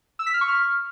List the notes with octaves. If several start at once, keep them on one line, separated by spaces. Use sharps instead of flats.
E6
B6
F6
C#6
F6